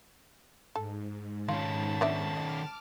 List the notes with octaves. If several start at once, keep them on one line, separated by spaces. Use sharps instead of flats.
G#2 A4
D#3 C#4 F4 A5
B3 D4 E5
D#5 D6 F6